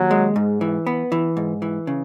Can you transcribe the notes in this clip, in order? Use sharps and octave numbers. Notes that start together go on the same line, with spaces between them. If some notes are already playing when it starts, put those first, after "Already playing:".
Already playing: D#2 F#3
G#3
G#2
E3
B3
E3
G#2
E3
C#3